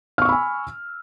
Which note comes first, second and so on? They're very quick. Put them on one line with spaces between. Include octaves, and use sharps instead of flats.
F6 C#6 E6 B5 G#5